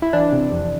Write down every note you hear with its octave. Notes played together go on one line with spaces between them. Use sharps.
E4
E3 D4
C3
F2